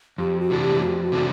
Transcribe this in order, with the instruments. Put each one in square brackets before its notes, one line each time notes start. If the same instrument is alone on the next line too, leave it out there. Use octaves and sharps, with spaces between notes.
[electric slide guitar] F2 [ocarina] G4
[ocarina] F#4
[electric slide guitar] C3 E3 A3 D4
[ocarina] G4
[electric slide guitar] F2 [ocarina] F#4
[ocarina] F#4
[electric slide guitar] C3 E3 A3 D4